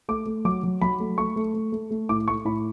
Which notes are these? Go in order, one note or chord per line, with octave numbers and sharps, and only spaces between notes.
A3 D6
A3
F#3 D6
F#3
F#3 B5
A3
A3 C#6
A3
A3
A3
A3
A2 D6
A3 C#6
A2 B5